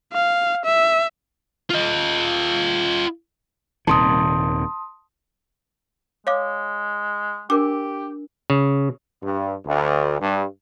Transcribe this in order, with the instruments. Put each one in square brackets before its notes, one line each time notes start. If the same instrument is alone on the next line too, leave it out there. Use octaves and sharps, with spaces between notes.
[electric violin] F5
E5
[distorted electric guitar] F4 D#5
[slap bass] D#1 C3 D#3 [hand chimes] A5 C6 D#6
[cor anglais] G#3 [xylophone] C#5 F5 D6
[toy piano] D4 A#4 [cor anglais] G4 [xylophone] D6
[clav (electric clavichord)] C#3
[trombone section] G2
D2
G2